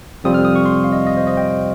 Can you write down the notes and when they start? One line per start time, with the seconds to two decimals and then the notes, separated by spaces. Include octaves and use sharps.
0.24 F2 C3 G3 C4 F4 D#6
0.34 F6
0.45 D#6
0.56 C#6
0.66 C6
0.84 F5
0.92 D#5
1.07 D#5
1.17 C5
1.27 D#5
1.37 G5